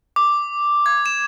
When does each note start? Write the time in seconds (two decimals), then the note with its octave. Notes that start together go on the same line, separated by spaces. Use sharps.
0.16 D6
0.86 G#6
1.06 E7